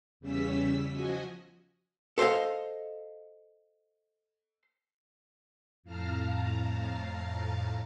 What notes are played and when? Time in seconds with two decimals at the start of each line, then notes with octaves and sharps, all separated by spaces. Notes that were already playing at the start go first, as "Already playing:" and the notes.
0.20 E2 C#3 G3 C#4 E6 B6
0.91 F3 F#4 D#5 G#5
2.18 A4 C5 D5 D#5 F5
5.83 F2 A2 F5 A5 A#5 F6